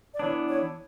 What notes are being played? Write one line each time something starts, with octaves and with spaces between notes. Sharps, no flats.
D5
E3 B3 D4 C#5
C#5